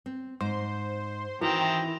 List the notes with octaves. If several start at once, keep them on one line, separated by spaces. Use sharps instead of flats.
C4
G#2 C5
D#3 E3 C4 F#4 G5